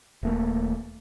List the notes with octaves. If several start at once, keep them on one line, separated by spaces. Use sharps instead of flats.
D#1 A3 A#3